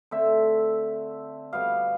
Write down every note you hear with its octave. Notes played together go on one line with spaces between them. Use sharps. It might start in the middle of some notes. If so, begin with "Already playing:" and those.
D3 A3 C4 E5
B2 G3 B3 F5